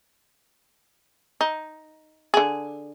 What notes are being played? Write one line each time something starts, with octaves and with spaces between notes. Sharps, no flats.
D#4
D3 G#4